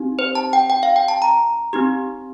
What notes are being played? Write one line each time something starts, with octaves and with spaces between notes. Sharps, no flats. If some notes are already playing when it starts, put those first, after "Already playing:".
Already playing: C4 D#4 G4
C5
A5
G5
G5
F5
G5
A5
A#5
C4 D#4 G4